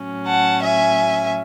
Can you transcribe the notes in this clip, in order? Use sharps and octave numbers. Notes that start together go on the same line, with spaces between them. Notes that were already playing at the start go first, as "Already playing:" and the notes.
Already playing: A2 F#3 C#4
F#5 A5
E5 G#5